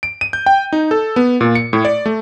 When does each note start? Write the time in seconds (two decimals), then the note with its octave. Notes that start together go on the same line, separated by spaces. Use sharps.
0.03 D7
0.21 D#7
0.33 G6
0.46 G5
0.73 D#4
0.91 A4
1.16 B3
1.41 A#2
1.55 C#7
1.73 A2
1.85 D5
2.06 A3